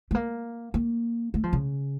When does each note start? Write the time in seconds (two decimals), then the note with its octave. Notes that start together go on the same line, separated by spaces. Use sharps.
0.11 A3
0.15 A#3
0.74 A#3
1.34 A3
1.44 F3
1.53 C#3